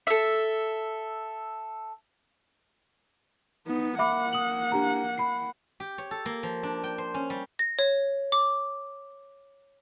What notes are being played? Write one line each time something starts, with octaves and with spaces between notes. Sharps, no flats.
A4 E5
B3 D#4
A#3 E5 F#5 B5 D6
D#6 F#7
D4 G4 A#5
B5 C7
G4
C#5
A4
A#3
F3
D4
G5
C5
C#4
G3
A#6
C#5
D6